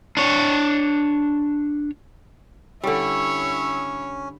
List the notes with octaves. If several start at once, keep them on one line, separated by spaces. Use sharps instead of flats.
D4 C#5
D3 G3 C#4 E4 C#5 E6